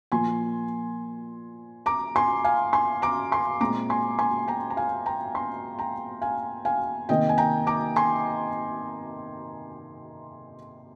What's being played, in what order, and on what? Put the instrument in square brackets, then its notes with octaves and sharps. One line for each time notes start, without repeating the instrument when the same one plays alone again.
[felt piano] A#2 F3 A#3 G#5 C6
A#5 D6
G#5 C6
F5 G#5
G#5 C6
A#5 D6
G#5 C6
A#2 G#3 C4 A#5 D6
G#5 C6
G#5 C6
G5 A#5
A#5
F5 G#5
G5 A#5
G#5 C6
G5 A#5
F5 G#5
F5 G#5
C3 D#3 A#3 D#5 G5
G#5
G5 A#5
A#5 D6
G#5 C6